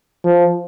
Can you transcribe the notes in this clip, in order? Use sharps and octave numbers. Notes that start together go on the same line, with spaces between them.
F3